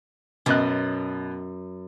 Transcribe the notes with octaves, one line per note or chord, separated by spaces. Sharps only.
F#2 B2 D#5 F#6